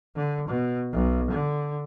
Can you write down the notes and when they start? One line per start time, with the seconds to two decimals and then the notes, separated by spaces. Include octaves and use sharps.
0.16 D3
0.48 B2
0.93 B1
1.31 D3